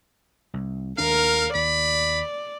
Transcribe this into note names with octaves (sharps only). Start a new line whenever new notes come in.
C2
D#2 D4 A#4 F5
D#2 D5 B5